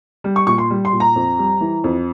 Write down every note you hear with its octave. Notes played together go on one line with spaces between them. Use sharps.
G3
C#6
A#2 C#6
C6
G3
C6
A#2
A#5
F2
G3
E3
F2